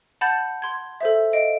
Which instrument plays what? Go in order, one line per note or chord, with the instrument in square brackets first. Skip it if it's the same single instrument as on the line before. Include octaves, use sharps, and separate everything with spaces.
[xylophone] F#5 A5 B5 G6 A6
C6 G#6
A4 C5 E5
D#5 F5 D7